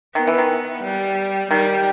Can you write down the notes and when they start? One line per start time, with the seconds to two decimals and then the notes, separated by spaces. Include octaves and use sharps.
0.15 D#3 B3
0.27 E3
0.38 D#3
0.83 G3
1.51 D#3 G3